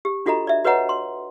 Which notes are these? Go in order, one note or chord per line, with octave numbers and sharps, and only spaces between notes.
G4
D4 F4 F#4 A4 D#5 A#5
D5 E5
F#4 B4 C#5 D#5 F#5 A#5
C6